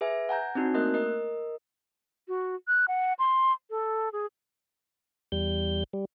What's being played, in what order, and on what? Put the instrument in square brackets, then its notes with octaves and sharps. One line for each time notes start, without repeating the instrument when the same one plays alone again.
[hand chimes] G#4 B4 E5 G#5
F#5 G#5 A#5 G6
C4 D4 D#4 F#4
A3 A#3 A#4 D#5 F#6
A#4 D#5
[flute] F#4
F#6
F#5
C6
A4
G#4
[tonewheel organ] E2 G3 G6
G3